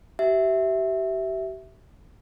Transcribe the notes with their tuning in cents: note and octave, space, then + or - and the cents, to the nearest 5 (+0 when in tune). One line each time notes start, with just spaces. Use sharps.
G4 -35 E5 -5